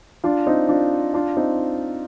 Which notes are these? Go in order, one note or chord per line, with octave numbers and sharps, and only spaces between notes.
D4 F4
C4 D#4
D4 F4
D4 F4
C4 D#4